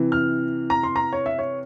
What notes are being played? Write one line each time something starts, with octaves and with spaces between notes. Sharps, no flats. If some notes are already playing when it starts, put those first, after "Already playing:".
Already playing: C3 E3
F6
A#5
C6
A#5
C#5
E5
C#5